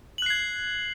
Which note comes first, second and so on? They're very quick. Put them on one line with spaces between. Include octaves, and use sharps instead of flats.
F#7 F#6 C7 G#6